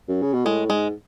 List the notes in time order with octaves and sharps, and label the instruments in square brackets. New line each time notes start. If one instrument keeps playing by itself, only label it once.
[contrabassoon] F#2
C#3
B2
[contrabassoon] A2 [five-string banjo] G#3
[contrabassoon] G#2 [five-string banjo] G#3